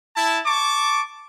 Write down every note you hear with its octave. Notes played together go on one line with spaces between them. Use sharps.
E4 A5
A5 C#6 D6